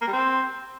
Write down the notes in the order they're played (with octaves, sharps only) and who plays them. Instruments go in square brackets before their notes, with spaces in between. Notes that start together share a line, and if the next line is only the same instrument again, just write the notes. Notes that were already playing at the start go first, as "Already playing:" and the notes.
[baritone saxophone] A#3
G3
C4